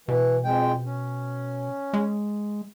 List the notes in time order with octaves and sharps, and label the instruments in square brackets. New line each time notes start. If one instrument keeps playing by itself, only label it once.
[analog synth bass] B2 [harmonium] E3
[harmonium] F2 G#3 G5
C#4
[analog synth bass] G#3